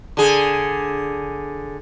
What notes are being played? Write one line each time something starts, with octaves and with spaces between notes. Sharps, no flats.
D3 G#4